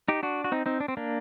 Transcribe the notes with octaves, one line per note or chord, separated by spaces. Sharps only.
D#4 G4
D4 F#4
F#4
C4 D#4
C4 D#4
D4
C4
A#3 D4